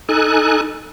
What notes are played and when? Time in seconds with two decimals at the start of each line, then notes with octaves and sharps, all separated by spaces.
0.09 D#4 A4 G#5 F#6